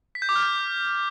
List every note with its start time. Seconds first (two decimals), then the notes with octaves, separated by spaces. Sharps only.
0.15 B6
0.22 G6
0.29 D6
0.36 F6
0.42 G6